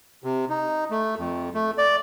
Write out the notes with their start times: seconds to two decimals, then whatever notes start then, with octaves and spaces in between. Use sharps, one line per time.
0.24 C3
0.49 D#4
0.91 A3
1.18 F2
1.55 A3
1.78 D5